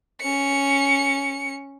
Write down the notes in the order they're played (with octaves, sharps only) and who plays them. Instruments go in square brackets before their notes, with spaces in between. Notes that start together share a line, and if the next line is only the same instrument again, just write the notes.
[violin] C#4 C#7